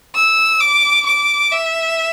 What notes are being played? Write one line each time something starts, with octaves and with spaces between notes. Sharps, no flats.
E6
D6
D6
E5